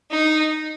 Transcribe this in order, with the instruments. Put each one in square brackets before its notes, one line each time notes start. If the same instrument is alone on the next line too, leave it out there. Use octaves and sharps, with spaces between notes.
[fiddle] D#4